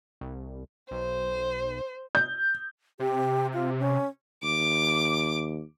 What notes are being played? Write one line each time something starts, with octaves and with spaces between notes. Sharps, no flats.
C2
B1 C5
G6
C3 G4
F4
C#4
D#2 D6